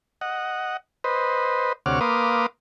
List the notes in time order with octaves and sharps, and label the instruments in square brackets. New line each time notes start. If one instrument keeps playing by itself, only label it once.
[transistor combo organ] D#5 F#5
B4 C5 D#5
D2 C3 C#5 F#5 D6 F6
A#3 B4 F5 C6 D6 D#6